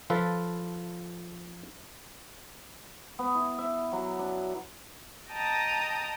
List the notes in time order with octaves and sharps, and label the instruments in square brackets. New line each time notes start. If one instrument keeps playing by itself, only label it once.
[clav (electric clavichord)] F3 F4 A4 B4
[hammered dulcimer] B3
E4
E5
F#3
D4
[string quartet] D#5 G5 A5 A#5 D#6